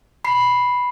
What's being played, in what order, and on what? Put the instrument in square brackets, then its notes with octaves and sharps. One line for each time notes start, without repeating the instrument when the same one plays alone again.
[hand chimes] B5 C7